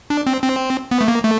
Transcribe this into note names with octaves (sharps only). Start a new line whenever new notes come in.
D4
C4
C4
B3
A3
A#3
A3